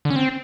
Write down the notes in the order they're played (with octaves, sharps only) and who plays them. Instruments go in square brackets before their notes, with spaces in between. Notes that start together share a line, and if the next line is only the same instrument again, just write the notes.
[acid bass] D3
C#4
C4